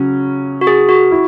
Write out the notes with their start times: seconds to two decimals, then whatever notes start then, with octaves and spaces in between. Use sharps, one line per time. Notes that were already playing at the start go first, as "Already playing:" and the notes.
Already playing: C#3 F#3 C#4
0.61 F#4
0.67 G#4
0.89 F#4
1.12 E4